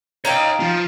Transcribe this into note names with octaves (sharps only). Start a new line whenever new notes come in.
D#4 C#5 D#5 F5 G5
F3 F4